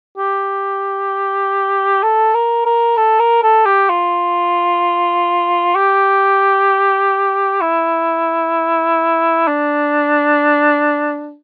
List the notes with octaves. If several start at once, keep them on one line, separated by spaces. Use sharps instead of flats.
G4
A4
A#4
A#4
A4
A#4
A4
G4
F4
G4
E4
D4